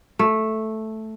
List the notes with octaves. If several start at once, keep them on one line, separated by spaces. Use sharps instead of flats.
A3